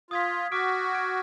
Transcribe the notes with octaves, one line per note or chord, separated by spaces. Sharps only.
F4 D#6 G#6 B6
F#4 D6 F6 B6 D7
F6 G#6 D7